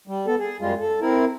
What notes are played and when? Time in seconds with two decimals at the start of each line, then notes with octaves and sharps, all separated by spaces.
0.07 G3
0.27 B3 A4
0.40 G#4
0.61 F#2 G3 G#3 F4
0.81 A4
1.01 C4 E4 A#4